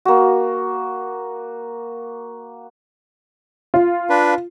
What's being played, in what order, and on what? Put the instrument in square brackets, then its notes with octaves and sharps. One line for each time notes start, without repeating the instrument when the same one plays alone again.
[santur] A#3 F#4
[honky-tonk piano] F4
[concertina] D4 B4